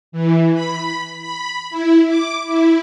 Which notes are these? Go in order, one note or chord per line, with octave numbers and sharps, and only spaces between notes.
E3
B5
B5
E4
D6
E4